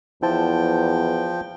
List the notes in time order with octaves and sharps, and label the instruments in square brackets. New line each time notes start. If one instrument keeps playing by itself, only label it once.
[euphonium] E2 [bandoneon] F3 G5 [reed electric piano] E4 C5 A5